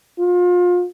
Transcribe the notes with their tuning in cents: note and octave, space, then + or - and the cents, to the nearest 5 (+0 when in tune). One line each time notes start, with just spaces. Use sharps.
F4 +30